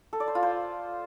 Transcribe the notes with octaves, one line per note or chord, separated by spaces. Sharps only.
A4
D5
C5
F4
C5